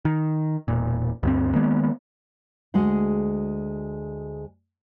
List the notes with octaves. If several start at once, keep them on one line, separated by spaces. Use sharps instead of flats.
D#3
E1 A#2
D2 G2 C4
D#3 G#3 A#3 B3
D2 G#3 F#4 G#4 F#5